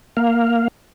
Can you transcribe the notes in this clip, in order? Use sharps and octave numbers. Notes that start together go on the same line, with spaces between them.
A#3 F5